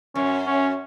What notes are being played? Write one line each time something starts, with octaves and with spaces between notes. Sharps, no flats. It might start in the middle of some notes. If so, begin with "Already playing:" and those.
F#2 C#4
C#4